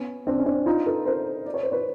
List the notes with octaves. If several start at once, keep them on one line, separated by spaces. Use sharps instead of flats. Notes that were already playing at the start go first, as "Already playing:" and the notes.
Already playing: B3 C#4
C4 D4
C#4
C4 D4
D#4 F4
A4 B4
A#4 C5
D5
C#5
C5
B4 C#5